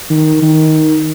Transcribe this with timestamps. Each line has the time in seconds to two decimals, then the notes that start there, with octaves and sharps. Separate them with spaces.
0.10 D#3
0.42 D#3